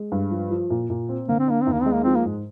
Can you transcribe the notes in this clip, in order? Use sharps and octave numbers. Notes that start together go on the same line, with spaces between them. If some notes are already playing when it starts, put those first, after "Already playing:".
Already playing: G#3
G2
F3
F3
A#2
A#2
C4
D3 A#3
C4
A#3 D4
C4
D#2 A#3
G#3 C4
A#3
F3 C4
A#3
G#2